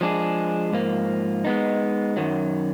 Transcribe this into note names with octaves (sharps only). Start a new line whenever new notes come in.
F3 G#3 D4 G#4
G#2 F3 A#3
G#3 B3 D#4
F#2 D#3 F#3